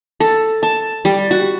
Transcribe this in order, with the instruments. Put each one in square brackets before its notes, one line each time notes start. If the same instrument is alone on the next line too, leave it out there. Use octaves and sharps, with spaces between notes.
[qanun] A4
A5
G3
F#4